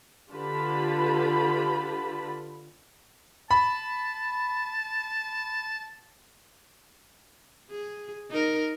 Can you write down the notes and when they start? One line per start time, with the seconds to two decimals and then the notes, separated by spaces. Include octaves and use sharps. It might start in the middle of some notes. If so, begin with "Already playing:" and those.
0.32 D3 F4 G4 B4 A5 B5
3.51 A5 B5
7.70 G#4
8.30 D#4 A#4